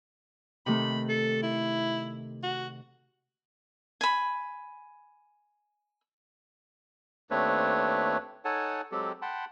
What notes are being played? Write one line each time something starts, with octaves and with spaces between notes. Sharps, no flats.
C3 D#3 A3 B5
A4
E4
F#4
G#5 B5
D#2 A3 C4 D4 B4 C#5
D#4 A4 C#5 F#5 G#5 A5
F#3 G#3 C4 G4 A4
F#5 G5 A5 B5 C6